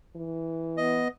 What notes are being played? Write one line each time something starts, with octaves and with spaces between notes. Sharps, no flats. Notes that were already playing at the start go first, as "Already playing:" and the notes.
E3
B3 D#5